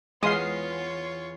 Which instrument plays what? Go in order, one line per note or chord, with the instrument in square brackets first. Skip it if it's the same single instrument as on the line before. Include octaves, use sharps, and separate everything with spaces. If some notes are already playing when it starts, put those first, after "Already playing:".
[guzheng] E2 [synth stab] G#3 C7 [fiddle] F4 C#5 [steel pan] F5 C6 D#6